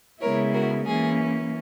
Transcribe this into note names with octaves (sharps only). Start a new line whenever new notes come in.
C#3 G#3 B3 E4 A#4 C#5
F#4 A#4
E3 A#3 C#4 G#4